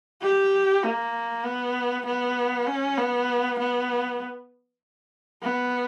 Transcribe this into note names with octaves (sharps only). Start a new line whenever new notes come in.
G4
A#3
B3
B3
C#4
B3
B3
B3